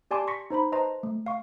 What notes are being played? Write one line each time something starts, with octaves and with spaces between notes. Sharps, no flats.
G4 D5 G#5 A5 C6 D6
C6 C#6 A#6 B6 C#7
D#4 C5 A#5 B5
B4 C5 D#5 A5 A#5 C6
A3
F5 C#6